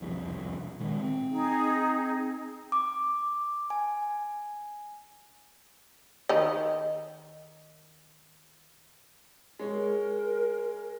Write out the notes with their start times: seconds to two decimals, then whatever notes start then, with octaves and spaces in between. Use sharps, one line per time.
0.01 E1 C2 F2
0.80 A#2 D#3 G#3
0.98 C4
1.31 D#4 G#4
2.72 D6
3.70 G#5
6.29 D#3 D#5
9.59 G#3 A#4 C#5